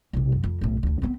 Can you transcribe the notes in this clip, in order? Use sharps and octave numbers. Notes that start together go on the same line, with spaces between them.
B1 C3
F#2
F2
B1 A2
D2 D3
B3 C4